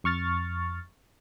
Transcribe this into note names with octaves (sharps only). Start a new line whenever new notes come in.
F2 C#6 F6 A6